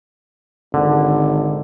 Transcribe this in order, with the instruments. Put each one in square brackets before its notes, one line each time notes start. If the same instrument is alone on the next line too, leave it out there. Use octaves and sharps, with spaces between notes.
[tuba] G#1 [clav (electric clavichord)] D3